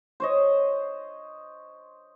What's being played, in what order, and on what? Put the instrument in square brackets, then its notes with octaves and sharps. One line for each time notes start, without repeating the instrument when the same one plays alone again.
[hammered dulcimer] C5 C#5 D#5